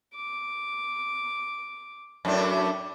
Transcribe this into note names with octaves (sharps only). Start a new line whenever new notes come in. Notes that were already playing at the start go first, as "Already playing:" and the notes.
D6
F#2 A2 D4